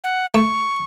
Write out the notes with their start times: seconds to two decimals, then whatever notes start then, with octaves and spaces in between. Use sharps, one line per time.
0.04 F#5
0.34 A3 C#6